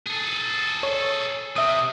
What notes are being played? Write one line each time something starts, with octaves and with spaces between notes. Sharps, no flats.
G#4 A4
C#5
C3 E5 D#6